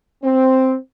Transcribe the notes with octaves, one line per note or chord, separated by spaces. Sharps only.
C4